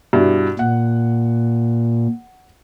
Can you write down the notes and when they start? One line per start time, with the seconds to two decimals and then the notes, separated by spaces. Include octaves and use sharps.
0.13 G2 B2 E4
0.59 A#2 F#5